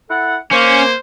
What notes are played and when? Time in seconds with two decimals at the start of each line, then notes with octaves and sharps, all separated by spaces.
0.10 E4 A4 F#5
0.52 A#3 C#4 C5